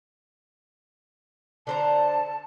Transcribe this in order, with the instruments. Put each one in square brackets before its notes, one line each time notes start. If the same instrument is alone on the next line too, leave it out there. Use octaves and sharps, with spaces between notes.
[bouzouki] D3 C5 A#5 [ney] A5